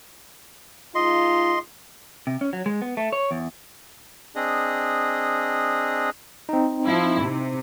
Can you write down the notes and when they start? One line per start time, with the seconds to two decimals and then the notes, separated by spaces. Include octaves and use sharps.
0.95 G#3 D#4 F4 D#5 C6
2.27 C3
2.41 C#4
2.53 F#3
2.66 G#3
2.82 B3
2.97 A3
3.13 C#5
3.31 E2
4.36 C4 D4 G#4 D#5
6.49 C4 D#4
6.85 F3 E4
7.23 C3